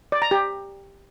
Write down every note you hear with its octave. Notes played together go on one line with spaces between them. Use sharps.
D5
A#5
G4